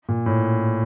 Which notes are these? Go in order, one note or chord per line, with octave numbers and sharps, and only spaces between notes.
A#2
A2